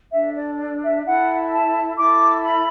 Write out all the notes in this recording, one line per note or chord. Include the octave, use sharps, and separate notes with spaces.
D4 A4 E5
D5
D5
E5
E4 A4 F#5
A5
E4 A4 D6
B5